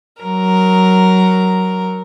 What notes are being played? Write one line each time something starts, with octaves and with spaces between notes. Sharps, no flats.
F#3 A#4